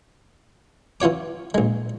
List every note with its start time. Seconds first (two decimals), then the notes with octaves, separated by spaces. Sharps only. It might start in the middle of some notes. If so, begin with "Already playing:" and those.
1.01 E3 F4 F#4 C#5 D6
1.54 A#1 G#3